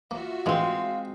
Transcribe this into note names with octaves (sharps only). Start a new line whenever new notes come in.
A#3 F4 F#4 E5
D3 E3 G#3 A3 C4 F5